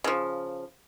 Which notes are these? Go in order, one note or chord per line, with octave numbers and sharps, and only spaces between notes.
C#3 F3